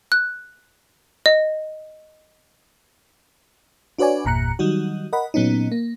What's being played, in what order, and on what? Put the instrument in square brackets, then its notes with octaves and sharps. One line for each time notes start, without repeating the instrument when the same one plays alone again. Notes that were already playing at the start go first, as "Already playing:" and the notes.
[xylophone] F#6
D#5
[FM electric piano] D4 F#4 B4 C#5 D5 G#5
G1 E2 A#2 A#5 F#6 C#7
D#3 F#3 G3 D#4 F#4
A#4 D#5 F#5 B5
A#2 F#3 B3 C#4 D#4
A#3